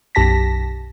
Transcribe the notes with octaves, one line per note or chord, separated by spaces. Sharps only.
B1 F#2 G4 A5 A#6 B6